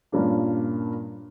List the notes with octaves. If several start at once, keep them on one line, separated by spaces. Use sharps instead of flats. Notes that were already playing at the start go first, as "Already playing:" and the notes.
G2 A#2 A#3 C#4 D4